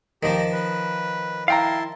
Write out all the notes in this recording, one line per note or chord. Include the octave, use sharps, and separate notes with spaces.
D#3 F3 G4 A#5
B4
E4 F5 G5 A5 A#5 C6